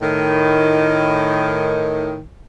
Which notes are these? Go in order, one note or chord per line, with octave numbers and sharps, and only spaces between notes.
A2 D#3